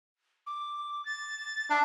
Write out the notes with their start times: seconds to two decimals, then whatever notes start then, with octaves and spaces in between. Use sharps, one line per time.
0.47 D6
1.05 A6
1.70 D4 E5